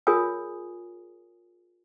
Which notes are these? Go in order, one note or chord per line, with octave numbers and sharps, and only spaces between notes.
F4 G#4 A#4 C#5 G#5 D#6